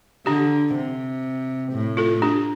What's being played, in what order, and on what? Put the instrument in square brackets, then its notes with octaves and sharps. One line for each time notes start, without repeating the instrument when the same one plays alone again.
[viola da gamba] D3 [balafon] D4 G4
[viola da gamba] C3
A2
[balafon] F4 A4
D4 G4